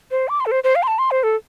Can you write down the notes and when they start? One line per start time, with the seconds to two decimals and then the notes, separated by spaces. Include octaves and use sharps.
0.11 C5
0.28 D6
0.40 C6
0.46 A4
0.51 C5
0.64 C5
0.75 F5
0.83 C6
0.87 A5
0.99 C6
1.11 C5
1.23 A4